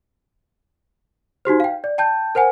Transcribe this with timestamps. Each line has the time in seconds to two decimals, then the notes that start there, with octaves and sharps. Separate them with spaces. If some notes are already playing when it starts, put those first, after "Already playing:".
1.45 D#4 F#4 G4 C5
1.60 F5 G5
1.84 D5
1.98 G5 A5 G6
2.35 A#4 C5 F#5 G#5